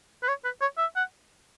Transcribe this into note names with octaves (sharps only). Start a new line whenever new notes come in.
B4
C#5
B4
C#5
E5
F#5